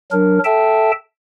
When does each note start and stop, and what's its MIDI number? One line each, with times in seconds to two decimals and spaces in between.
0.12 0.39 54
0.12 0.39 62
0.12 0.39 70
0.44 0.91 69
0.44 0.91 76
0.44 0.91 79
0.44 0.91 81